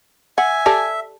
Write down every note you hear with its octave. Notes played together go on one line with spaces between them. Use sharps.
E5 F#5 G#5
G4 A4 D5 A5